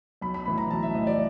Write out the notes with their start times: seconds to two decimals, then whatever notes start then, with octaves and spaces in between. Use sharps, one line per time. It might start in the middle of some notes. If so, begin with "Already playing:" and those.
0.21 B1 B5
0.34 B5
0.46 A2 E3 B5
0.58 A#5
0.70 B1 A5
0.83 E5
0.95 A2 E3 D#5
1.07 D5